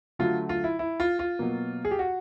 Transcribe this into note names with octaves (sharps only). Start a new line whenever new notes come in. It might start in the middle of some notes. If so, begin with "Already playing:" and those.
D3 F#3 A3 F4
F4
E4
E4
F4
F4
B2 F#3 A#3
G#4
G4
F#4